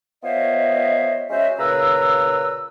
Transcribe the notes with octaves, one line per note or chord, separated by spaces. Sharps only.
B3 F4 C5 C#5 D#5 E5
G#3 C#4 F#4 C5 E5
A#2 C#3 B4 A#5 E6